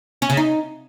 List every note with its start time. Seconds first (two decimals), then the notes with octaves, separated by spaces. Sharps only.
0.22 C#4
0.30 C#3
0.37 D#4